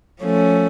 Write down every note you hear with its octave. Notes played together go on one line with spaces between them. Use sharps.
F3 A3 C#4